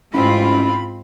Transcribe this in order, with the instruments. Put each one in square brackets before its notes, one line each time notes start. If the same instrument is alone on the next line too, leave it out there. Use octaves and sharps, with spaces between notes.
[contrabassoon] A1 [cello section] G#2 C4 F4 [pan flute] C#4 [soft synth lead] B5